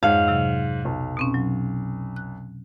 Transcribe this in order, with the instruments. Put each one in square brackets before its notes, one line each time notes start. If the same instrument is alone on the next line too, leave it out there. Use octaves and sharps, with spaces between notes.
[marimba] F2 C#5 F#5 [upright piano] G#2 [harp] F5
[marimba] C3 F#3
[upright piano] B1
[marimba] B2 C4 C#4
F#3
F#6